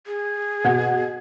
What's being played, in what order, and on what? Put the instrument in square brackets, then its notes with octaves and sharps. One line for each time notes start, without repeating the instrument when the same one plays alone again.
[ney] G#4
[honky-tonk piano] B2 F#5 G#6